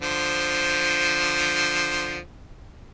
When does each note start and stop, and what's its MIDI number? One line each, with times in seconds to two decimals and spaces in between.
0.02 2.19 50
0.02 2.19 53
0.02 2.19 72